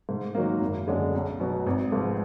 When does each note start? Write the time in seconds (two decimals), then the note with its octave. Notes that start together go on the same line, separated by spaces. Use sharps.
0.09 G#2
0.35 D#3 F#3 A#3
0.61 F#1
0.88 F#2 D3 G#3
1.14 B1
1.40 B2 F#3 B3
1.66 G#1
1.92 G#2 F3 B3